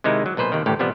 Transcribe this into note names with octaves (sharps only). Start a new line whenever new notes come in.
C3 D#3 G#3 D#4 E4
F#3
B1 A#2 B4 C5
D#2 C3 D#3
A1 D2 A2 G4
C3 F3 G3 B3